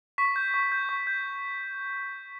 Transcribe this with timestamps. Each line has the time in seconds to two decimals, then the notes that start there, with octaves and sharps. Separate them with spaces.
0.18 C#6 B6
0.36 G6
0.54 C#6
0.72 G6
0.89 C#6
1.07 G6